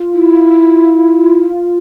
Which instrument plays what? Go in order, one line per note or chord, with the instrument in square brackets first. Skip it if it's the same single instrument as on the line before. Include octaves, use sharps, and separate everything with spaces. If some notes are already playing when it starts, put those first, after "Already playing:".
Already playing: [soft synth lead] F4
[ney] E4